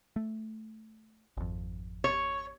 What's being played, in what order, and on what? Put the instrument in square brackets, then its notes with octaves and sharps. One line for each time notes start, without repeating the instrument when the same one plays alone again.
[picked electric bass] A3
G#1 F2
[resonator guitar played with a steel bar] C#5